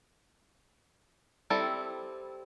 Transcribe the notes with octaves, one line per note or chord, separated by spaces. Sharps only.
G3 C4 E4 A4